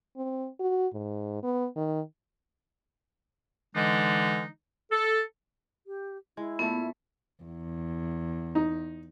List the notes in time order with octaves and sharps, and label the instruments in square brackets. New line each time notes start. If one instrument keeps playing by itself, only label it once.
[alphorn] C4
F#4
G#2
B3
D#3
[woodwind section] D3 E3 G#3 D4 D#4
A4
[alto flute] G4
[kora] G#3 [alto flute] E4
[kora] A#2 A3 [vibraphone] B3
[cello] E2
[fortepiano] D#4